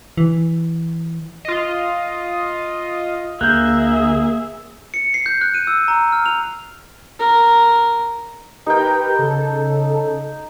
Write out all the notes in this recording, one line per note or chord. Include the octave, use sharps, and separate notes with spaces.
E3
F4 D#5
D2 A#3 G#4 E5 F#6 G6
C#7
C7
G6
F#6
D#7
E6
A#5
F6
F7
A#4
D#4 G4 A#4 B4 G5
C#3 A4